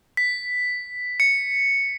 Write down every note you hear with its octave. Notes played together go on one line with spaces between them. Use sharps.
B6
C#7